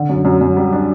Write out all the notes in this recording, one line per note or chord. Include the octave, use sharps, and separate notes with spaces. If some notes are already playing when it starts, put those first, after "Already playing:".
Already playing: D3
F#2
F#2
F#2
G3
D4